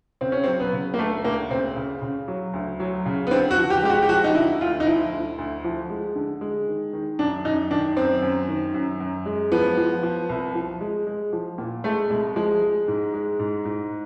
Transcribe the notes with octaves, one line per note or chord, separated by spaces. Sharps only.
C#3 C4
C#4
C4
F#3
B3
C#3
A#3
D2 A3
D2 A#3
C#3 C4
C#3
C#3
F#3
D2
F#3
C#3
B3
D3 C4
F#4
F3
G4
G#3 G4
F#4
G4
F3 F#4
D#4
D3 E4
D2 F4
D#4
F3 E4
D2
D2
F3
G#3
D3
G#3
D#3
D#3
F#2 D4
F#2 D#4
D#3 D4
F#2 C4
F#2
D#3
F#2
F#2
G#3
F3 B3
F3
F3
C2
F3
G#3
G#3
F3
A#2
G#3 A3
C2 G#3
F3 G#3
G#3
G#2
G#3
G#2
G#2